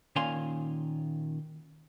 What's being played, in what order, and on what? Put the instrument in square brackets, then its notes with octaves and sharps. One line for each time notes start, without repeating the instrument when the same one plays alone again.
[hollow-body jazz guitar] A#2 D#3 C#4 F5 G#5 C6